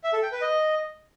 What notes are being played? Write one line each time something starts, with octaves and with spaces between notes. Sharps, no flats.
E5
A4
G5
B4
D#5